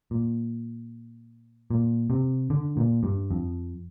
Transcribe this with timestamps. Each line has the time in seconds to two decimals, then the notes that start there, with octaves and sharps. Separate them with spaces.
0.11 A#2
1.71 A#2
2.10 C3
2.50 D3
2.77 A#2
3.03 G2
3.31 F2